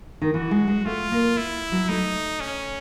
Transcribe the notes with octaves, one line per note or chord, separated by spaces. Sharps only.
D#3
E3 F#4
G#3
G#3
A3 F4
A#3
E4
F#3
A3 D#4
C#4